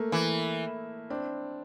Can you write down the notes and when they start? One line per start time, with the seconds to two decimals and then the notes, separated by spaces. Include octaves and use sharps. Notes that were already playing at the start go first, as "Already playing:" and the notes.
Already playing: A3 A#3
0.12 E3
1.10 C4 D4